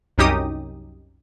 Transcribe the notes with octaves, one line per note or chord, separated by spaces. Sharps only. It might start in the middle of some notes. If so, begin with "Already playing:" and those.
C2 F#2 C#4 D#4 G4 D#6